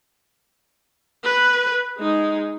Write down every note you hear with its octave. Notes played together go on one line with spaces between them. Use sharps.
B4
G#3 D#4